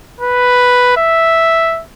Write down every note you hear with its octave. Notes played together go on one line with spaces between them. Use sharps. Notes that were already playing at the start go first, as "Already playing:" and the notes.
B4
E5